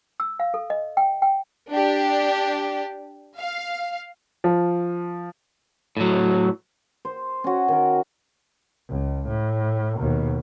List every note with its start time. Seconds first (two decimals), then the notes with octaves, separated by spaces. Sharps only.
0.20 E6
0.40 F5
0.54 A4
0.70 D#5
0.97 G5
1.22 G5
1.70 D4 G4
3.38 F5
4.44 F3
5.97 A2 F#3
7.05 C5
7.44 C#4 F#4
7.68 D#3 A#4
8.89 C#2
9.28 A2
9.99 D#2 B2